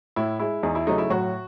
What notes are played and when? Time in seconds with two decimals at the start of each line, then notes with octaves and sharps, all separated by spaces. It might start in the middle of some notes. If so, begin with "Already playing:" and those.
0.16 A2 E4
0.40 G#3 E4
0.63 E2 D#4
0.75 E4
0.87 C#3 F#3 A3 D#4
0.98 E4
1.10 A2 F#3 F#4